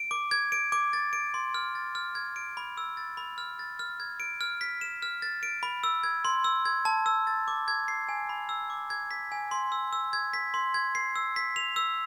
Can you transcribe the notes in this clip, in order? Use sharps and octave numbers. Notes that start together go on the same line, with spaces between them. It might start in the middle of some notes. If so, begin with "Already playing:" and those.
Already playing: D7
D6
G#6
D7
D6
A6
D7
C6
F6
A6
F6
G#6
D7
B5
E6
A6
B5
F6
A6
F6
G#6
D7
F6
B6
E7
F6
A6
D7
B5
E6
G#6
C6
E6
G#6
A5
E6
A6
D6
G#6
C7
G#5
B5
E6
D6
G#6
B6
G#5
C6
E6
E6
G#6
B6
C6
G#6
C7
E6
B6
F7
E6